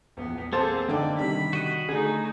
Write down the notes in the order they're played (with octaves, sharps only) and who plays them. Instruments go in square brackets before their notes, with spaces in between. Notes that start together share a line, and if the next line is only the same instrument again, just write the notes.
[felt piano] A#1 E2 [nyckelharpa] B3
[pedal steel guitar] A#3 [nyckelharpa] C4 G#4 [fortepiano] A4 C5 A5
[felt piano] F#1 D#4 G5 [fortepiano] D3 [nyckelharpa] D5
[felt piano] C3 D#3 G3 [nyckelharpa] B5
[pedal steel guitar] F#4 D#5
[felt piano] D3 [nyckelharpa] A3 D#4 [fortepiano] G#4